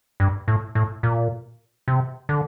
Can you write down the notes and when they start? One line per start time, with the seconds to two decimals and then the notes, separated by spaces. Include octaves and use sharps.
0.20 G2
0.48 A2
0.75 A2
1.03 A#2
1.88 C3
2.29 D3